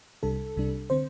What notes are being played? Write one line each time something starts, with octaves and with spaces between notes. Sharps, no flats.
C2 C3 G3 D4 A4
C2 C3 G3 D4
D3 C4 C5